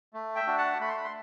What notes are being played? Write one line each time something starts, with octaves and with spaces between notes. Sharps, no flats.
A3
E5 G5
D4 F#4
F#5 A5
A3 B5
C6
B5
C6